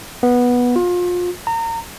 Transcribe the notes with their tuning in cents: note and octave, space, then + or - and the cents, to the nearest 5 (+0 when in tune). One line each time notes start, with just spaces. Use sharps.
B3 -10
F4 +30
A#5 -30